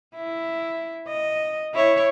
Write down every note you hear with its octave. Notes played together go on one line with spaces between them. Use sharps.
E4
D#5
E4 C#5